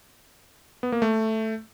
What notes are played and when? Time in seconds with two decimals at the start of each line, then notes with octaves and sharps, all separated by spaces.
0.83 B3
0.92 A#3
1.02 A3